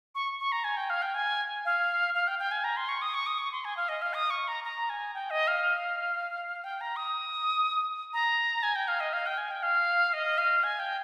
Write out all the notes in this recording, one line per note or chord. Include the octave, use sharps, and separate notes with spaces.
C#6
C#6
A#5
G#5
G5
F5
G5
G#5
F5
F5
G5
G5
G#5
A#5
C6
C#6
D#6
C#6
D#6
C#6
C6
G#5
F5
D#5
F5
D#6
C#6
A#5
A#5
G#5
G5
D#5
F5
G5
A#5
D#6
A#5
G#5
G5
F5
D#5
F5
G5
G#5
G5
F5
D#5
F5
G#5
G5